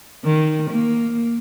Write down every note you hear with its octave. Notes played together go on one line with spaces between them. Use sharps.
D#3
A#3